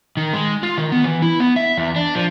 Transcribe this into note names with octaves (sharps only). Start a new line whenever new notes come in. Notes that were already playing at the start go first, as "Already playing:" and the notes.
D#3
G#3
F4
D#3
B3
E3
E4
B3
E5
E2
D4
F3